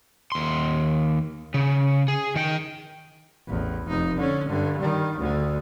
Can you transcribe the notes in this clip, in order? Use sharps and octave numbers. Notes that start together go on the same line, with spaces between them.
D#2 C6
C#3
G#4
D#3 G5
A1 E2
F1 D#4
D3 C#4
G2 D3
D#3 G3
D2 D3